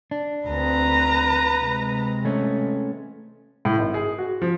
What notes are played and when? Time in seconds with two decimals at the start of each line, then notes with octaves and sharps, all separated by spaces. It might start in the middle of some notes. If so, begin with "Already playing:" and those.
0.11 D4
0.47 D2 C4 B4 A#5
1.61 C3 G#3
2.25 A3 C#4
3.65 A2
3.78 G#1
3.94 G#4
4.18 F#4
4.42 F3